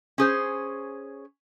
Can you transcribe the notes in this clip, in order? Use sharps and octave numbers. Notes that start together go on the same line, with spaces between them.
C#4 G#4 C5